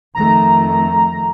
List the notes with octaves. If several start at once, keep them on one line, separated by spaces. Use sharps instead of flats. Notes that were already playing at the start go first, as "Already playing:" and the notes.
F2 D#3 A3 A#5